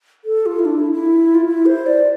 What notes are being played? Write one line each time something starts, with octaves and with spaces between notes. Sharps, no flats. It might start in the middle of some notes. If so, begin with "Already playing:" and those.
A4
F4
E4
D4
E4
E4
F4
E4
C5
D5